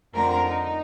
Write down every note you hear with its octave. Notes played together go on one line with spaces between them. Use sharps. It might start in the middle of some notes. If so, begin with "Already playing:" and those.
F2 D3 A3 C4 A#4
D#4